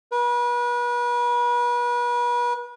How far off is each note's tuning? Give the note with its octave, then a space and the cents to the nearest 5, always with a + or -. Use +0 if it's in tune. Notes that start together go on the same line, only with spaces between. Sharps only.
B4 -35